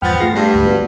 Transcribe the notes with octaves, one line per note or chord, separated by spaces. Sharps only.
E2 G2 F3 B3 G5 F6 A6
A3 F4 G#4 C6 A#6
G2 A3 G4
D2 G#2
B3 F#4